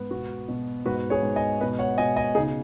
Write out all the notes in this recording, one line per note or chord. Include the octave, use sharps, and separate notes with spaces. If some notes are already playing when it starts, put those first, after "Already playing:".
Already playing: G#2 B3
B2 F#4
B2
G#2 F#4 B4
G#4 C#5
G#2
D#5 G#5
B2 B4 D#5
C#5 F#5
B2 D#5 G#5
D#5 G#5
C#3 D#4 G#4